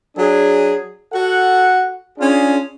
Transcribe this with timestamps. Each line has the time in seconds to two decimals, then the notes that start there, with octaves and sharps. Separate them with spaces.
0.16 F#3 D4 G#4
1.13 F#4 A4 F#5
2.19 C#4 D4 F4 G#4